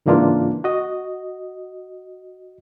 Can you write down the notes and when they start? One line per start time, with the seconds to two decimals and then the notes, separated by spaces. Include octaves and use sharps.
0.06 G#2 C#3 E3 A#3 D4 F4
0.64 F#4 D#5